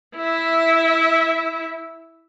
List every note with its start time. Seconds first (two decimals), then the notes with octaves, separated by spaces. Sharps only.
0.17 E4 E5